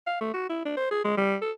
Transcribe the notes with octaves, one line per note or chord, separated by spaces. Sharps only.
F5
A3
F#4
E4
D4
C5
G#4
G#3
G3
A4